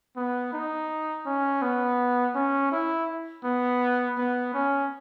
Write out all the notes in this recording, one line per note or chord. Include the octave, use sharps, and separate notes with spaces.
B3
D#4
C#4
B3
C#4
E4
B3
B3
C#4